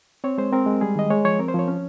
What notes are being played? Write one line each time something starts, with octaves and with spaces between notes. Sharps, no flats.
C4 C#5
G#3 C5
C4 A#4
G#3
G3 G#4
D#3 D#5
G#3 C#5
F3 C#5
C4 A#4
C5
F3 C#5
C#4